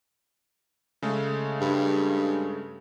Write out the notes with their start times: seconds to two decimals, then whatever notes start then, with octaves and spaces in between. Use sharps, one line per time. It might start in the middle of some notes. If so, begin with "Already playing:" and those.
1.02 C#3 G#3 A3
1.61 G2